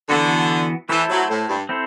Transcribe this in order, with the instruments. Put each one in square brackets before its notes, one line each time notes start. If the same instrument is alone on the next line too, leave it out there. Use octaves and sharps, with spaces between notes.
[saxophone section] D3 [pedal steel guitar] E3 B3 F#4
[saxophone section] E3 [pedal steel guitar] A3 E4 A4 C5
[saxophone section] F#3
A2
G2
[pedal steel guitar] C4 E4 A4 C5